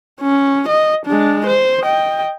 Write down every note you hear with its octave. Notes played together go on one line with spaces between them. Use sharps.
C#4
D#5
G#3 D4
C5
D#5 G5